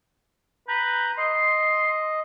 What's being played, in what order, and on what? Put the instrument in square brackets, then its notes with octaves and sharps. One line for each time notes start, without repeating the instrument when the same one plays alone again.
[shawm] B4 [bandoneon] A#5 G6
[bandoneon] D#5 [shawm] C6